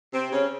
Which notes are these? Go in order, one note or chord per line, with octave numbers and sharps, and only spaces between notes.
C3 C4
C#3 C#4